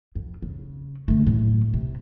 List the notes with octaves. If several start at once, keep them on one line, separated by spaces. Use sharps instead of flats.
F2
C#3
D3 A3
A2 F#3
C3